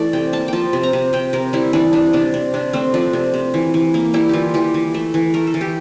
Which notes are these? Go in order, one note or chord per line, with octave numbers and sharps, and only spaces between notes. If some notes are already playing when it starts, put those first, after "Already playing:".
Already playing: E3 A3 D5
C3 G5
A#3 A5
F3 G5 A5
C3
A#5
C3
C3 G5
C3 A#4
G3 E4
E3 D4
C3 D4
C3 D4
C3
C3 D4
A3 C4
F3 D4
C3
C3
E3
E3
A#3
G3 E4
E3 F4 G4
E3 G4
E3
A3
E3
A3 A#4
A4
E3
G4